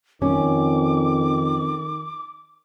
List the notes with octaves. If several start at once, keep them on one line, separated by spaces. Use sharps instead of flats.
F2 D#3 C#4 D6